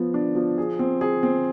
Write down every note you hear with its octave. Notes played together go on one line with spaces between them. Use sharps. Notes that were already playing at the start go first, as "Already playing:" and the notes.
Already playing: F3 B3
D4
F3
G#4
C4
G#4
C4